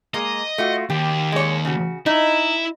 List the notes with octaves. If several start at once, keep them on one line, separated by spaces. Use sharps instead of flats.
G#3 A#3 D#5
A3 F4 F#4
D#2 G4
G#3 C#5
C#3 F#4
D#4 E4